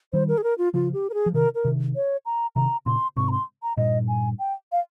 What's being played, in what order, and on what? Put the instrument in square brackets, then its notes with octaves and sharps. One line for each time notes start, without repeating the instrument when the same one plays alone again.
[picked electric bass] D#3 G3 [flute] C5
[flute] A#4
G#4
A#4
F4
[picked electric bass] C#3 F3 [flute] F4
[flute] G4
A#4
G#4
[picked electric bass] F3
[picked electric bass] C3 D#3 [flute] A#4
[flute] A#4
[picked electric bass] C3 D#3
[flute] C#5
A#5
[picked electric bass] C3 D#3 [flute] A#5
[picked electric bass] A#2 C#3 [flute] C6
[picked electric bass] G#2 C3 [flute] C#6
[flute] A#5
C6
A#5
[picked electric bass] G2 A#2 [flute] D#5
[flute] G#5
G5
F5